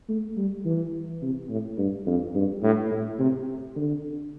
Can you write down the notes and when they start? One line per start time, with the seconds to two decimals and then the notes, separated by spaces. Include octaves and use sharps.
0.09 A3
0.37 G3
0.65 E3
1.22 C3
1.49 A2
1.78 G2
2.06 F2
2.35 G2
2.63 A2
2.91 A2
3.19 C3
3.76 D3